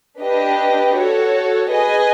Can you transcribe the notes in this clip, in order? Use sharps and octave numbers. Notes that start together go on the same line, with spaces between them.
D4 G4 B4 D#5
F#4 A4 C#5
G#4 B4 D#5 G#5